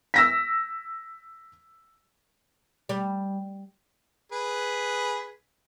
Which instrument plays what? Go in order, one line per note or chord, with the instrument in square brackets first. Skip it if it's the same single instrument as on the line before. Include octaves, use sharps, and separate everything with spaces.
[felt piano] E6 A#6 B6
[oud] G3
[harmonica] G#4 B4